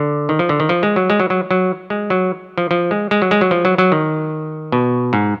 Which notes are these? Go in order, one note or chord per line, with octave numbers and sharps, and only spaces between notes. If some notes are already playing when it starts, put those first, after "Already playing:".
Already playing: D3
D#3
F3
D3
D#3
F3
G#3
F#3
G#3
F#3
F#3
F#3
G#3
F#3
F3
F3
G#3
G#3
F#3
G#3
F#3
F3
F#3
F#3
D#3
B2
G#2